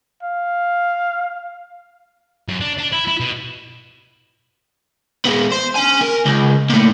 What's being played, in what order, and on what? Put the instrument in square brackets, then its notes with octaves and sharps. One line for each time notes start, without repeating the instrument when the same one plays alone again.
[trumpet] F5
[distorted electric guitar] F#2
D4
D4
E4
E4
B2
[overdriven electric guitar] G#3 B3
C5
C#4 G#5
A#4
C#2
A#2 A3